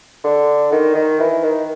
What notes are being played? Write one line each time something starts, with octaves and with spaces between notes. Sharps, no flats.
D3
D#3
D#3
E3
D#3